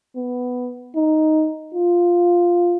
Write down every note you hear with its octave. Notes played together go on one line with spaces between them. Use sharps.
B3
D#4
F4